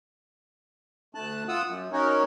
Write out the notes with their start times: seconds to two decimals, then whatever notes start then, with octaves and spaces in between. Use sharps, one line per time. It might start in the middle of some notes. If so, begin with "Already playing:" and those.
1.15 D2 A3 A5 F#6
1.49 F4 F#5 D#6 E6
1.67 F#2
1.92 C#4 D#4 F#4 A#4 C#5